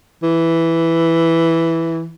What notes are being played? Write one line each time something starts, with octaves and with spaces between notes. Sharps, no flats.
E3